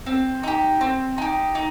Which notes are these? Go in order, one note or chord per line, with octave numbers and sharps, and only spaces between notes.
C4
D#4 G4
C4
D#4 G4
D#4